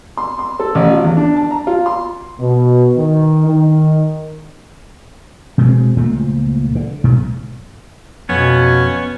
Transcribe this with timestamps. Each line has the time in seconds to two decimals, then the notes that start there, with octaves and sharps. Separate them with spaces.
0.17 C6
0.39 C6
0.60 A4
0.75 A1
0.89 F4
1.04 E2
1.17 D4
1.36 A5
1.51 A#5
1.67 F4
1.86 C6
2.39 B2
2.97 D#3
3.47 D#3
5.58 B2 G#3 C4
5.96 C#2 A#2 F3 A3
6.75 D3
7.04 B1 G#2 B2
8.29 F2 B2 B3 C#4